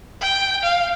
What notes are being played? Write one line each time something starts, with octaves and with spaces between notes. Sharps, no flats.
G5
F5